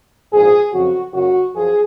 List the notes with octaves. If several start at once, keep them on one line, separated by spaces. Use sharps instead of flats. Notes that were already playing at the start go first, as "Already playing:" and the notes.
A#1 G#2 F3 G#4
F2 C#3 F#3 F#4
F#1 F#2 C#3 F#3 F#4
F#2 F3 G#4